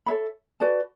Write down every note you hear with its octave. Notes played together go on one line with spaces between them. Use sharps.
A4 C#5 E5 B5
F#4 B4 D5 A5